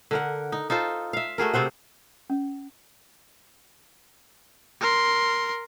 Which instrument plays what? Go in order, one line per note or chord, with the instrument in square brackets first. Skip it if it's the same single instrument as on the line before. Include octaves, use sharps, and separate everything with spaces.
[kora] D3 A#4 F#5
D#4
D#4 F4 A4 C5
E5 F5
A3 F#4 G#4 A#4
C3 C4 C5 F#5
[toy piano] C#4
[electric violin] A#4 C6